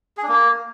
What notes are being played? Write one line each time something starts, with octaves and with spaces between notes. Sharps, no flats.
G#4
D4
A#3